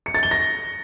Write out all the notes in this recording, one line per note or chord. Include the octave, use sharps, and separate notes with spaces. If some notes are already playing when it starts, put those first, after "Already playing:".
C#7
A6
G7
A#6